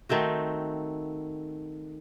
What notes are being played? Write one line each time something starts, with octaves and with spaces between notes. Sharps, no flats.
D#3 A3 C4 F#4